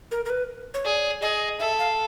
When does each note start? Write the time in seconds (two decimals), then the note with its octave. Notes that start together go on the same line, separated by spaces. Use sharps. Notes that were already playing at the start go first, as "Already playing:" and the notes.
0.11 A#4
0.25 A#4
0.30 B4
0.74 C#5
0.85 G#4 D5
1.22 G#4 D#5
1.59 A4 E5
1.79 F5